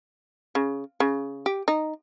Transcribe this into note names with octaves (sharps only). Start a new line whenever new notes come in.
C#3
C#3
G4
D#4